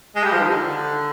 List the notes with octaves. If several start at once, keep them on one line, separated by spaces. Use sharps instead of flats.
G#3
G3
F3
D#3
D3